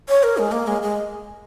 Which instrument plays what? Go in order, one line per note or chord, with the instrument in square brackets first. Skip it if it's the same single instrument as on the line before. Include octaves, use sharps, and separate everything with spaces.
[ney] C#5
A#4
G#3
A#3
G#3
G#3